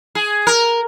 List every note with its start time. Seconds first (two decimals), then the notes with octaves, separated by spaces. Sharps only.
0.15 G#4
0.47 A#4